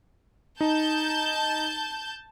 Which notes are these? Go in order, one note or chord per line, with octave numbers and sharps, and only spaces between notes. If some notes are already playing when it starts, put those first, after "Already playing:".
D#4 A5 G6